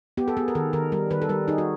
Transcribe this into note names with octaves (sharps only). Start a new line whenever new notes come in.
B3 G4
A4
B3 G#4
A#4
D#3 A4
D#3 A#4
G3 A#4
D#3 B4
A4
G3 A#4
D#4 G#4
F#4